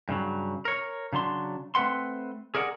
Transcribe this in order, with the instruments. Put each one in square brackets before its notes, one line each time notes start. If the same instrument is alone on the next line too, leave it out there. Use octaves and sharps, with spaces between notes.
[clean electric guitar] G2 C#3 F#3
A#4 C#5
C#3 F#3 D4 C6
A3 C4 B4 F#5 C6
G#4 A#4 D5 E5 F#5